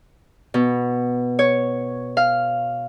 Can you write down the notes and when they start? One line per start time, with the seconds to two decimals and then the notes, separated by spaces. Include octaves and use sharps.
0.54 B2
1.39 C#5
2.17 F5